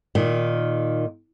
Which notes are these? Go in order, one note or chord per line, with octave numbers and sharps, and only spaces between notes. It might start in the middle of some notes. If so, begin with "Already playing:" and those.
A#2 D#3